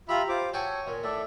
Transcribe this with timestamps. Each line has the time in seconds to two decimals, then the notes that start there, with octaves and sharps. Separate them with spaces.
0.09 F4 G4 E5 A#5 B5
0.29 F4 C5 D6
0.54 F#4 A4 C#5 G5 G#5
0.87 A#2
1.03 A2 A4 D5 E5